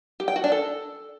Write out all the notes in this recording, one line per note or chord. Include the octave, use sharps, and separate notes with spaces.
G4
G5
F#4
D4
A4